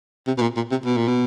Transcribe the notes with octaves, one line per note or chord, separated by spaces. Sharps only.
C3
B2
A#2
A#2
C3
B2
A#2
B2